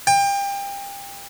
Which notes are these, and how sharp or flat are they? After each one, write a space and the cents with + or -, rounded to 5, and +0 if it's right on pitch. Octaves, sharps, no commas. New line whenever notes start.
G5 +30